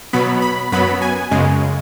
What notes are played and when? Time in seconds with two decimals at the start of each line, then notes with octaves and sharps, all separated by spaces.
0.13 B2 F#3 B3 B5
0.42 B5
0.72 F#2 F#3 B3 B5
1.02 G#5
1.31 F#2 C#3 G#3